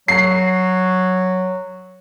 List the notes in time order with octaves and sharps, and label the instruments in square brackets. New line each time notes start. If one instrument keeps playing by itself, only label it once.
[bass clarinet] F#3 [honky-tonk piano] C7